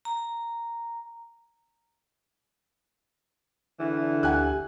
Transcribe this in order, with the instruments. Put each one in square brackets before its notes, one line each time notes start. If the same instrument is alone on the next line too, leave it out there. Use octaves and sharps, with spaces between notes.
[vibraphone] A#5
[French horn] D3 [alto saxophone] E3
[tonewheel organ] D2 G4 [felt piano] F#5 G#5 F#6